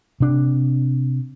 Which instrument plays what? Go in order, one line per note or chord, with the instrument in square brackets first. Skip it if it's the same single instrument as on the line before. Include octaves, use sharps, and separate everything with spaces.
[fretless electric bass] C3 D4